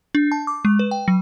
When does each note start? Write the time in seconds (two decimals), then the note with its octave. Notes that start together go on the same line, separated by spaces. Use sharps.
0.15 D4
0.32 A5
0.47 D6
0.65 G#3
0.79 B4
0.91 G5
1.08 F#3